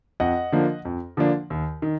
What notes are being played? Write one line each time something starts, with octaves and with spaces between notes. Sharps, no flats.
F2 D#5 F#5
D3 F3 A#3 D4
F2
D3 F3 A#3 D4
D#2
D#3